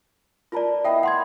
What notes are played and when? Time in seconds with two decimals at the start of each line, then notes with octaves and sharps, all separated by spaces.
0.52 F4 A#4 B4 D5 A5
0.84 B3 E4 D#5 E5 G5
1.03 F#5 C6 G#6